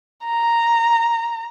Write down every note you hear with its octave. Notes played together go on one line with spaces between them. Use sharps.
A#5